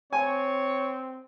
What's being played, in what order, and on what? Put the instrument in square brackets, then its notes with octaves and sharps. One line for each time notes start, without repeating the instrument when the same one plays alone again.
[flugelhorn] C4 [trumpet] C#5 [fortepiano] G#5